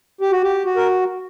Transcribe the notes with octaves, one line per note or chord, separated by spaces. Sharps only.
G4
F#4
G4
F#4
A#4